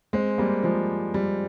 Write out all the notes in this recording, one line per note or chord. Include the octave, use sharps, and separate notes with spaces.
G#3 C4
G3 A#3
F3 G#3
G3